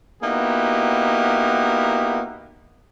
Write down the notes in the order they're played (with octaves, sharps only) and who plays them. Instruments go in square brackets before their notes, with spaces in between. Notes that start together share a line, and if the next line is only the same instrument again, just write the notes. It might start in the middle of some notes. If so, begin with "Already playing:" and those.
[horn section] A#3 B3 D#4 E4 F#4 G4